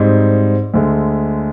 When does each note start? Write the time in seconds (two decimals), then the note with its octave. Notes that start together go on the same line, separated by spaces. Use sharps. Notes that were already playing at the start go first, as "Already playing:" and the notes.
Already playing: G#2 G3 C4 D#4
0.74 D2 D3 G#3